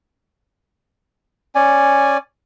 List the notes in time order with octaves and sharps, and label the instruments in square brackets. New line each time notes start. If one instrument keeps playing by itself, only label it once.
[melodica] C#4 D5 G#5